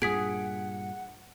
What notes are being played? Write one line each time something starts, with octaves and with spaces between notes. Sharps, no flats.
G2 A#2 G#4 F#5 D#6 B6 D7